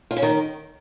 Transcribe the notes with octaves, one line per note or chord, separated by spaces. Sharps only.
F4
C#4
D#3